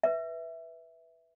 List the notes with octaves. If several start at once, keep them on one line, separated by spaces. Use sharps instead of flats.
B4 E5